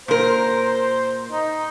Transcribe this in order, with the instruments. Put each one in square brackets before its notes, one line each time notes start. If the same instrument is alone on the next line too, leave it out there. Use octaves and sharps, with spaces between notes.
[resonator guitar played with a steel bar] A#2 A#4 [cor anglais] C5
[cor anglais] D#4